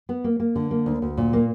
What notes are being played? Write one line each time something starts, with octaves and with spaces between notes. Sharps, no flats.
B3
A#3
A#3
D3
A#3
D2
D2
A#2
A#3